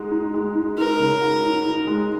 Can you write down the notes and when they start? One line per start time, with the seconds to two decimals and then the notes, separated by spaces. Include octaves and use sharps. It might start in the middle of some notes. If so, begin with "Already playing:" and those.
Already playing: G#3 D#4 F#4
0.11 D#4
0.34 G#3
0.55 D#4
0.78 D#4 A#4
0.99 C#3
1.21 F#4
1.44 D#4
1.65 D#4
1.87 G#3